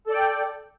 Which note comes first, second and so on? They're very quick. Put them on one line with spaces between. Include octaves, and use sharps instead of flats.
A4 D5 G5